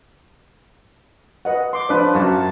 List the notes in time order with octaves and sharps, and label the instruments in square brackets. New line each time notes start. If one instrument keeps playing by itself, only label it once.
[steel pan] B4 D#5 F#5
C6 D6
[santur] F3 B4 [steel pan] C#4 D4 D5
[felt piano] F#2 [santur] A#3 F#4 A5